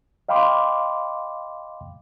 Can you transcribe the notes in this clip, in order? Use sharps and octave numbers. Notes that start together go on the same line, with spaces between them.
D#5 F5 G5 B5 C6 D6